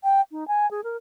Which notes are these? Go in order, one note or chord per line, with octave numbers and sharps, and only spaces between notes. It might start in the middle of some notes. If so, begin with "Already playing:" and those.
G5
D#4
G#5
G#4
A#4